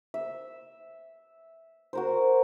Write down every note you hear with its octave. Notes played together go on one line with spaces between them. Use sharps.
E5
F#4 A#4 C5